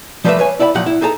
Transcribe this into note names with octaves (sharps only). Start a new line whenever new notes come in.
F3 G3 A3 A#3 B4 E5
B4 C#5 G#5
E4 D5 E5 G5 B5
A#2 F3 F#3 G4 F#5
E4
D#4 G#4 A4 A5 A#5